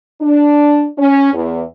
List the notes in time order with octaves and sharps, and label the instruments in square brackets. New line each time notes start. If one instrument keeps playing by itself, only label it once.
[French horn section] D4
C#4
E2